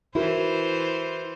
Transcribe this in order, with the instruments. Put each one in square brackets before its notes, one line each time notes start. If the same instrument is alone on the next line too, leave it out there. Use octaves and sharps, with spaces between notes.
[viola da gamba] E3 C5 [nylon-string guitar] E4 F#4 A#4